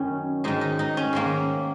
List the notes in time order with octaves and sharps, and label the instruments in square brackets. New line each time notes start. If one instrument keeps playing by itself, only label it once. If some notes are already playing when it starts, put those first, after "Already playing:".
Already playing: [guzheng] F#2 D#3 C#4
G#2 D#3 D#4
D#4
D#4
C#4
G#2 D#3 A#3